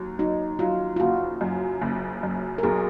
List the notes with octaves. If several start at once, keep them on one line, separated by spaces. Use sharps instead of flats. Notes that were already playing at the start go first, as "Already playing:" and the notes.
Already playing: D#2 F#3
F#3 D#4
F#3 F4
F4
F#1 F#4
F#2
F#1
F#2
A#4
B1 G#4